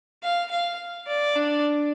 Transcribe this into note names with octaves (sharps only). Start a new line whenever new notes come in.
F5
F5
D5
D4